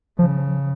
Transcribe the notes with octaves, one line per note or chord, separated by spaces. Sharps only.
C#3 F3